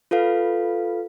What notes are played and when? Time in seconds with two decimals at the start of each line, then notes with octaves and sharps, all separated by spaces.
0.11 F4 A4 B4 F5